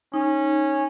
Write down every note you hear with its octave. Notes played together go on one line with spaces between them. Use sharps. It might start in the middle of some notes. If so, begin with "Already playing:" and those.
C#4 D#4